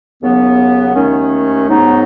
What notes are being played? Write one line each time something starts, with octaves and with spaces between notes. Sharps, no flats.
D#2 C#3 F#3 B3
D#2 D#3 A3 C#4
G#2 F#3 B3 D#4